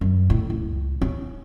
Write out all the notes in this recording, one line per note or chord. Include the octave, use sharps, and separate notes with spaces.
F#2
A2
C#2
C#4